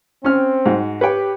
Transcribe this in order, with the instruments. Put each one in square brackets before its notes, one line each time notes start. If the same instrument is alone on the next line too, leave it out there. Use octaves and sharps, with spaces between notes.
[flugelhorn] C4 [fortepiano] C#4 F6
[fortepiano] G#2 F#4
[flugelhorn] G4 [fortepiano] B4 C#5 G5